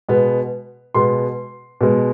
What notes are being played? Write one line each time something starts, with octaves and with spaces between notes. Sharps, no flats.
B2 G#3 B3
B2 G#3 B3 C6
B2 G#3 B3